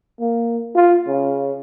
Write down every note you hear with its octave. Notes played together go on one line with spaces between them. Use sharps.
A#3
F4
C#3